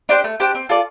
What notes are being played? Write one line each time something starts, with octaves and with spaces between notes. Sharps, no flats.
D4 G4 C5
A3
D4 G4 C5
C4
F4 A4 D5